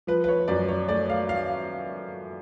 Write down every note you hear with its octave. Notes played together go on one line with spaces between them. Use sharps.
F3 B4
B4
C#5
F#2 D5
C#5
A3 D5
F5
F5